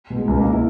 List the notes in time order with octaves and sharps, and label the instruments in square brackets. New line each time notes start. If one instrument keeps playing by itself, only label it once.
[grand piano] B2
[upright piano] G#3
[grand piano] C#2
[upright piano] A#3
E4